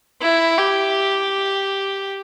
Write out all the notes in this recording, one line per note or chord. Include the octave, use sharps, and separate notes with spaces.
E4
G4